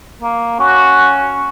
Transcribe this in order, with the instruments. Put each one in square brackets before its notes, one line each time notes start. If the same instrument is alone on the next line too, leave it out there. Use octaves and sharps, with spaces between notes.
[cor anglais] A#3
[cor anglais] C#4 [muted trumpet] F#4